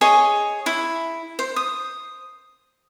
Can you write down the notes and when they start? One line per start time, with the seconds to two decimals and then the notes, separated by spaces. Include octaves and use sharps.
0.01 G#4 C#5 D#5
0.66 E4
1.39 C5
1.56 D#6